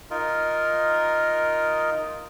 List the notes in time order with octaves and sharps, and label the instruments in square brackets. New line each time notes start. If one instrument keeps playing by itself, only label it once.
[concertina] D#4 F4 A#4 D#5